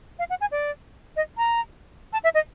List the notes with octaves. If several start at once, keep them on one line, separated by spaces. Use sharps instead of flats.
F5
F#5
G#5
D5
D#5
A#5
A5
E5
D#5